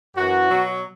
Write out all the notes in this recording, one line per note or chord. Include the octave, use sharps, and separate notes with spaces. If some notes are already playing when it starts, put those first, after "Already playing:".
F#2 E3 F#4
B2 F#3